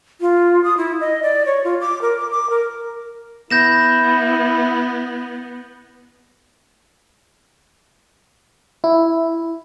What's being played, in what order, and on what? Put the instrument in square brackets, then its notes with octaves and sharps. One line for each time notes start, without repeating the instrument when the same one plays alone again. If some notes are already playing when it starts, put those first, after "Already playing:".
[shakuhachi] F4
D#6
E4
D#5
D5
C#5
F4
D6
A#4
D6
D6
A#4
[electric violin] B3 [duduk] E4 [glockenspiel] G6 A#6 E7
[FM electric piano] E4